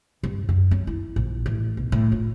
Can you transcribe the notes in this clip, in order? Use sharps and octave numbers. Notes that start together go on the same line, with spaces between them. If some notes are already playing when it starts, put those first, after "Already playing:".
G2
F#2
F#3
E4
A#1
A1
B1
A2
F4